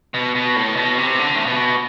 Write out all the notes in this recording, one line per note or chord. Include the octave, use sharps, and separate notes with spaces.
B2
B2
A2
B2
C3
D3
A2
B2